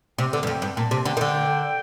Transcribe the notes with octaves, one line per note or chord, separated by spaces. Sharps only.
C3 G5
D3
G2
F2 G5
G2
A#2 A5
C3
D3 G5
D#3
D3